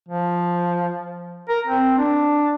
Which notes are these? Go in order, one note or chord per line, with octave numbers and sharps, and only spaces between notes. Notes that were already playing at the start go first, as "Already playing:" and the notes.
F3
A#4
C4
D4